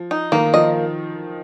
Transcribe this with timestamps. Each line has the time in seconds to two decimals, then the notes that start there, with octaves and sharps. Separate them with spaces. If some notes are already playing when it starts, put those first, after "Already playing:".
Already playing: F3
0.11 D#4
0.32 D#3 A#3
0.53 F3 D#5